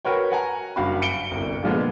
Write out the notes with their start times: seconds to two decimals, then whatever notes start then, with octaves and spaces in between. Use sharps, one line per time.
0.05 F#4 A#4 B4 C#5 G5
0.32 F#5 G#5 A#5
0.76 F#1 G2 F#4 F5 F#5 B5
1.02 C#7 D7 G7
1.31 G1 C2
1.63 A#2 D3 F3 G#3 B3